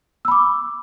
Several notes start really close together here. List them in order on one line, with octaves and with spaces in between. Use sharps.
E6 B5 D6